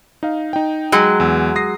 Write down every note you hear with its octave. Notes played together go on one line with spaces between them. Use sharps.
D#4 F5
D#4 G5
F#3 G#3
E2 E6
D#6 A#6 C7